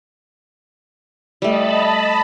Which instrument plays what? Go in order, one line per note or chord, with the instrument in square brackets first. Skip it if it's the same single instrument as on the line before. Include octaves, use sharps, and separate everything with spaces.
[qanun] G3 A3 [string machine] D#5 A5 B5